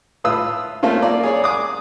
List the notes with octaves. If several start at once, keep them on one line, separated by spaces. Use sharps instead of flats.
A2 F4 B4 D#6 E6
A3 A#3 C4 C#4 F4
A#3 F4 D5
G#4 C#5 D5
G#5 D6 D#6